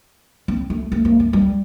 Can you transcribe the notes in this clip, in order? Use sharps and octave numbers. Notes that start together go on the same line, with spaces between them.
C4
A3
A3
A#3
A3
G3